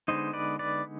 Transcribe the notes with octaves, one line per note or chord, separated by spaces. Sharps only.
D3 G#3 B3 D#4 C5 D#5
B4 D5
B4 D5